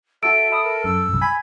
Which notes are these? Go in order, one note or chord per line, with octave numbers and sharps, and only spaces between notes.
F#4 A4 E5 A5 E6 D7
E5 B5 D#6 E6
A#4
F#2 E6
C2 F#2
G#5 B5